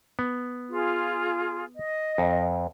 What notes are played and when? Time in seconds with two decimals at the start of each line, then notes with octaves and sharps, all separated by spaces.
0.19 B3
0.70 F4 G#4
1.76 D#5
2.18 F2